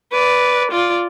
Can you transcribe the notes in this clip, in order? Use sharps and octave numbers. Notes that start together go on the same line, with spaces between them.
B4 D5
F4 D5